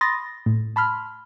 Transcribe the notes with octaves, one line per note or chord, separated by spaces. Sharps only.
B5 C6 D#6 A6 A#6
A2
A5 B5 C6 F6